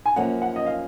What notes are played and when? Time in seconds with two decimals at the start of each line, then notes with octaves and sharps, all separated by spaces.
0.06 G#5
0.16 F#2 F3 A#3 C#4 F#5
0.42 F#5
0.56 D#5
0.66 F5